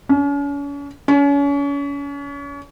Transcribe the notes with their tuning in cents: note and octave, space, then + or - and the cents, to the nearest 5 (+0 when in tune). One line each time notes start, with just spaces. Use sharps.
C#4 +40
C#4 +35